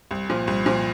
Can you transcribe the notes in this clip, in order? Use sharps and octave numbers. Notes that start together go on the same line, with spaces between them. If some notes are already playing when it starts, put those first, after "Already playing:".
C2
A#2 F3
C2
A#2 F3